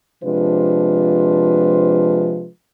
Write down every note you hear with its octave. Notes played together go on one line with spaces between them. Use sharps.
C3 F3 G#3 D4 F4 B4